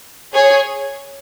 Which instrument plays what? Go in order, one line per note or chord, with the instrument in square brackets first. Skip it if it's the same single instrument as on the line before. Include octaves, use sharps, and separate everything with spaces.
[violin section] G#4 C#5